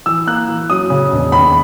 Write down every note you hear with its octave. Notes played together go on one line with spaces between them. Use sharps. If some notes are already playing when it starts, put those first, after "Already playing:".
E3 E6
A#3 F#6
E3
F#2 D#6
C#3
E1
D#2 B5